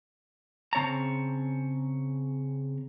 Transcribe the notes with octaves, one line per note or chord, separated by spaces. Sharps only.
C#3 C4 C#5 A5 A#5